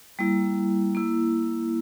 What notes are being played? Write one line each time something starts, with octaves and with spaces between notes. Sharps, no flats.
G3 A#3 E4
A#3 E4